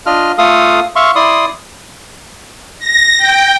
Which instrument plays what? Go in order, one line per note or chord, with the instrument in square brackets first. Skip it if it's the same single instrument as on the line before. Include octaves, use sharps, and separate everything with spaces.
[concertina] D4 F4 D#5 F6
A3 F4 A4 F5 D#6
E5 F5 C6 C#6
E4 D5 C6 D#6
[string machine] A#6
G5